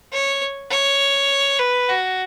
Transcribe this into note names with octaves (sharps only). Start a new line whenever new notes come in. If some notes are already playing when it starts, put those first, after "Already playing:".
C#5
C#5
B4
F#4